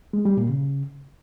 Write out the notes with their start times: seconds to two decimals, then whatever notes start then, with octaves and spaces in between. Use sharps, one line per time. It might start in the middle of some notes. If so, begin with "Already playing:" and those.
0.13 G#3
0.25 G3
0.37 A#2
0.49 C#3